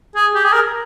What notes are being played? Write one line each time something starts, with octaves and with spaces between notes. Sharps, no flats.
G#4
G4
G#4
A#4